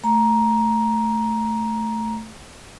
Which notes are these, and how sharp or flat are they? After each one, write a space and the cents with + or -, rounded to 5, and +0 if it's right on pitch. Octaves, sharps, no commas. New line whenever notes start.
A3 +0 A#5 +10